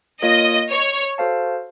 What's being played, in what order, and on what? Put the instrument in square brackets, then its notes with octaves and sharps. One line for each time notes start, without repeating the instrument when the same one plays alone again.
[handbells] A#3 F4 A#4 C#5 F5 [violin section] D#5
[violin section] C#5
[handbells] F#4 A4 C5 F5 A5